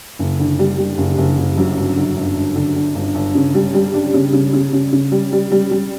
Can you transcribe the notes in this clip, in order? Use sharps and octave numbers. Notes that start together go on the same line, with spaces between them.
F#1
D3
G3
G3
F#1
F#1
F#1
F#2
G1
D3
G1
G1
D3
D3
G1
G1
C#3
G3
G3
D4
C#3
C#3
C#3
C#3
C#3
G3
G3
G3
G3